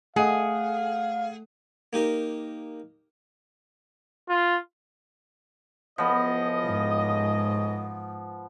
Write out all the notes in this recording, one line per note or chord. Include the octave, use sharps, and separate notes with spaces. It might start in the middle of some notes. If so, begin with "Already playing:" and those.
A3 G#4 D#5 F5 F#5
A#3 D#4 G4 A#4
F4
C#2 A2 F3 B3 D#5
G#2